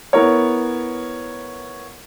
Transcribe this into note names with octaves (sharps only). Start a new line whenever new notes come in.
B3 E4 A#4 C#5